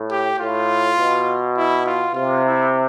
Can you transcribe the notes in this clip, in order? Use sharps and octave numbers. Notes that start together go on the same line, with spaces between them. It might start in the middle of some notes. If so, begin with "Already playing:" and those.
Already playing: A2
G4
A2 F4
B2
E4
F4
C3 F4
E4